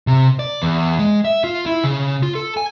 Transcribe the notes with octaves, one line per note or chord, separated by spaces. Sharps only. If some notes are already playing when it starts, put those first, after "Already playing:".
C3
D5
E2
G#3
E5
F4
E4
C#3
F4
A4
G#5